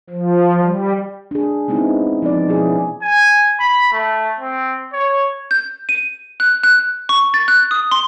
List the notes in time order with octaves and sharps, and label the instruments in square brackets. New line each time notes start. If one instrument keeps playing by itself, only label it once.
[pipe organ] F3
G3
[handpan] D4 G#4
G#3 B3 C4 D#4 E4
F3 B3 C4 D#4 D5
B2 F3 B3 C#4 E4 G#4
[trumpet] G#5
B5
A3
C4
C#5
[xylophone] G6
D#7
F#6
F#6
C#6
A6
F#6
D#6
C6